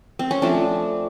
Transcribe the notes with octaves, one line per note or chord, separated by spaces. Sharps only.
C4
C#4
F3 A3 C4 D4